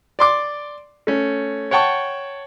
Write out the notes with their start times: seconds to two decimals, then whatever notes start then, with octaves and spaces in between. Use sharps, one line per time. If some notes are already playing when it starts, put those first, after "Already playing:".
0.19 D5 C6 D6
1.07 A3 C#4
1.71 C#5 F#5 G5 A5 C#6